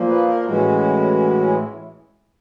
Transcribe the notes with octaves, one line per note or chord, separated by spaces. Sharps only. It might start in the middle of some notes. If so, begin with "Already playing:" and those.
Already playing: A#2 F3 A#3
B4
A#4
A2 E3 G#3 C#4 E4 F#4